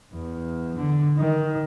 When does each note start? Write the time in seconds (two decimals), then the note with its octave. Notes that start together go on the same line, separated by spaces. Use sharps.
0.13 E2
0.77 D3
1.17 D#3